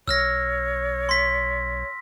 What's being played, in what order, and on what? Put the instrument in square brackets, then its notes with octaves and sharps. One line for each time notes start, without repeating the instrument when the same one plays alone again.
[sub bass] B1 [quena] C#5 [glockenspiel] E6 F6 A#6
[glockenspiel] C6 B6